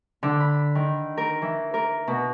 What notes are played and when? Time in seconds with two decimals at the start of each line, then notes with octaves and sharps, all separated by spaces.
0.23 D3
0.40 B5
0.75 D#3
1.17 A#4
1.42 E3
1.74 A#4
2.08 B2